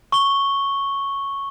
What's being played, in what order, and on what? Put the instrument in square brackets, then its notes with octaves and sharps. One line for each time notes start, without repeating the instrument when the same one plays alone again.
[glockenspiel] C#6 G7